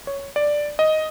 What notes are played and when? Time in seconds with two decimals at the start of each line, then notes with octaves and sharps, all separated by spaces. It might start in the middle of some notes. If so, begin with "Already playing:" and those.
0.07 C#5
0.36 D5
0.79 D#5